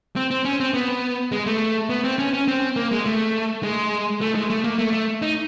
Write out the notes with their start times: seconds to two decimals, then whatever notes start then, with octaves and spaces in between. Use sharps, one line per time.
0.16 C4
0.31 C4
0.45 C#4
0.60 C4
0.74 B3
1.32 G#3
1.46 A3
1.90 B3
2.04 C4
2.19 C#4
2.33 C#4
2.48 C4
2.76 A#3
2.91 G#3
3.05 A3
3.63 G#3
4.21 A3
4.35 G#3
4.50 A3
4.64 A#3
4.79 A3
4.93 A3
5.22 D#4